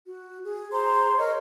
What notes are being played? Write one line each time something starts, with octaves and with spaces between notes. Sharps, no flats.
F#4
G#4
G#4 C5 A#5 C6
A#4 C#5 D#5